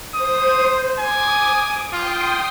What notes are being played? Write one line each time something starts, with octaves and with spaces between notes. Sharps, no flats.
C5 D#6
G#5 D6 D#6
F4 G5 C6 D#6